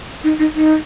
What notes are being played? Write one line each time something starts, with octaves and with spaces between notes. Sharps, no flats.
D#4
D#4
D#4